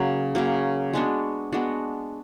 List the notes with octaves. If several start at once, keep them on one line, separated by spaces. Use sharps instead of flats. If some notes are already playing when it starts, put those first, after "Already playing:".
Already playing: C#3 F#3 A#3
C#3 F#3 A#3
G#3 B3 D4 F#4
G#3 B3 D4 F#4